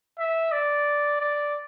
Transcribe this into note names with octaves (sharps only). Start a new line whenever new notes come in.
E5
D5
D5